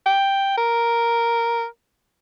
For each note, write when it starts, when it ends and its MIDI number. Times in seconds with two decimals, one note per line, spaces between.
0.06 0.55 79
0.57 1.65 70